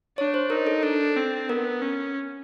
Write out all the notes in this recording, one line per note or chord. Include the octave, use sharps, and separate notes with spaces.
D4 C#5
C5
D#4 A#4
A4
D4 A4
C4
B3 A#4
C#4